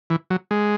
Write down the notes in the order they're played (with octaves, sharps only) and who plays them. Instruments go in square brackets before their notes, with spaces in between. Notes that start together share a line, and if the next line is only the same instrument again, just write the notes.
[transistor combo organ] E3
F#3
G#3